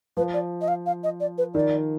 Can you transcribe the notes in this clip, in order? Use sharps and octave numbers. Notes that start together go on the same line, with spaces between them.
F3 B4
D5
D#5
F5
F5
D#5
D5
B4
D#3 D5